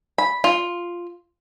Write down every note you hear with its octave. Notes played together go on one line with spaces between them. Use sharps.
B5
F4